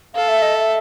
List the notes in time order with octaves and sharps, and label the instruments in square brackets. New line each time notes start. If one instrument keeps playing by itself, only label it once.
[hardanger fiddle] A4 [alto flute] F5
[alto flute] E5
D#5
E5